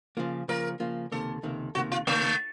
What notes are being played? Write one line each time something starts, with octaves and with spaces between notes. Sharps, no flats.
C#3 F3 A#3 F4
C#3 F3 A#3 F4 A#4
C#3 F3 A#3 F4
C#2 C3 D#3 A#3 A4
C#2 C3 D#3 A#3
C#2 C3 D#3 A#3 F#4
F4
C#2 C3 D#3 A3 A#3